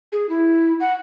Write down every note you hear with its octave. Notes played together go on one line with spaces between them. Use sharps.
G#4
E4
F#5